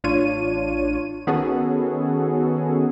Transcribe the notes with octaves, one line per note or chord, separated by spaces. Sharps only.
A1 D4 F4 C#5 D#7
D#3 B3 C#4 F#4 G#4 A4